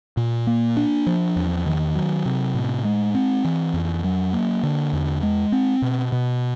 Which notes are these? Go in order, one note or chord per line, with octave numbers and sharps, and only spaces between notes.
A#2
A#3
D4
F3
E2
D#3
F#3
C3
A2
G#3
C4
E3
F2
F#3
A#3
D3
E2
G#3
C4
B2
B2